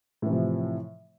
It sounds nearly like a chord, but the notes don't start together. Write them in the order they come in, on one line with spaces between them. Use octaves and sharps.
A2 E3 C3 F3